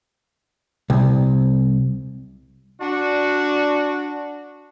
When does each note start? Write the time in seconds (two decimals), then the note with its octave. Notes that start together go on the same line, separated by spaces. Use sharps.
0.90 C2
2.82 D4 F#4